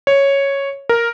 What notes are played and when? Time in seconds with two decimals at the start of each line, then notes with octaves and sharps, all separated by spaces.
0.07 C#5
0.89 A#4